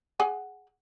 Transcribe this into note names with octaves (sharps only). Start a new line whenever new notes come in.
G#4 F#5 G#5